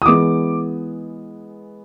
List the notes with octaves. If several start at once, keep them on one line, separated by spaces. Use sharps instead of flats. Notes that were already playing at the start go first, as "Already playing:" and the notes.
D#6
E3 G#3 B3 D6